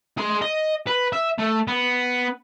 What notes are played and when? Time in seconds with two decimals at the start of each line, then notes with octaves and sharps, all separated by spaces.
0.18 G#4 C6
0.42 D#5
0.87 B4
1.13 E5
1.38 A3
1.68 B3